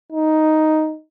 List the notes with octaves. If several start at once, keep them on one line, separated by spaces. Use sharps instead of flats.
D#4